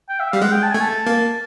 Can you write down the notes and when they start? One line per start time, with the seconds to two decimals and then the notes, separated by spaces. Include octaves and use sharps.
0.09 G5
0.20 E5
0.31 G3 F5
0.42 G#3 F#5
0.52 G5
0.63 A5
0.72 A3 G#5
0.81 A5
1.06 A#3